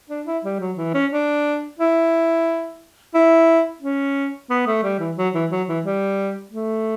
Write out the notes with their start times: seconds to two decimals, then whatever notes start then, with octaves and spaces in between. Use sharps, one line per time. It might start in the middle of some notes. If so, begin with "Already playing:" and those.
0.10 D4
0.27 E4
0.44 G3
0.60 F#3
0.77 E3
0.94 C#4
1.11 D4
1.79 E4
3.14 E4
3.82 C#4
4.50 B3
4.67 A3
4.84 G3
5.00 E3
5.17 F#3
5.34 E3
5.51 F#3
5.68 E3
5.85 G3
6.52 A3